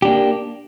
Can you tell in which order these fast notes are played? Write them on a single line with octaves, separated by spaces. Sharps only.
G4 D4 A#3